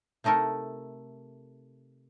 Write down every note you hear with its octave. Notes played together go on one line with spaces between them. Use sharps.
C3 A3 D#4 A4 A#4